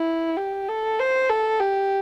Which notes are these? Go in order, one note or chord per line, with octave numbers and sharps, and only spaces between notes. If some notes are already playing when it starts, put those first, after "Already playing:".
Already playing: E4
G4
A4
C5
A4
G4